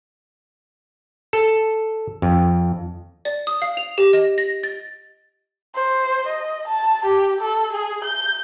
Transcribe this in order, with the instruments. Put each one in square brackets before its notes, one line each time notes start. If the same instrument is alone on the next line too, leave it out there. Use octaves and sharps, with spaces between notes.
[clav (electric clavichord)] A4
F2
[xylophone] D5
D#6
F5
F7
G4
D#5
A#6
A6
[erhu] C5
D#5
A5
G4
A4
G#4
G6